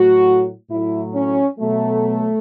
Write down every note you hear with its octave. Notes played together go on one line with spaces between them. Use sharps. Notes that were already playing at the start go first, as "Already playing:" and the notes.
Already playing: A2 F#3 F#4
A2 F#3 E4
C#4
B2 F#3 A3